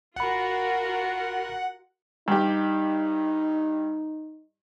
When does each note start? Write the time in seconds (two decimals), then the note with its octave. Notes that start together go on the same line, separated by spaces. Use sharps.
0.16 A1 F4 F#4 A#4 F#5 B5
2.28 G2 D#4 G4